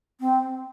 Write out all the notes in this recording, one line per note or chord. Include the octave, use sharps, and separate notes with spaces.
C4